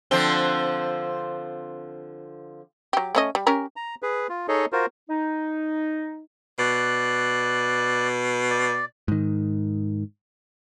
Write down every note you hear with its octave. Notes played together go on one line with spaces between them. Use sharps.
D3 F3 C4
F#3 G4
A3 C#4 D#5
G3
C#4 G4 A#4
A#5
G#4 B4
F4
D#4 G#4 A4 C#5 D#5
F4 F#4 A#4 C5
D#4
B2 D5 F#6
D5
G#2 D#3